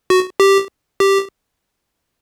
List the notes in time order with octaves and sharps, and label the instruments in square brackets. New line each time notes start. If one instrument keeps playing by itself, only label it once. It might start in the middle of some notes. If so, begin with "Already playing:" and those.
[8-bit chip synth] F#4
G4
G4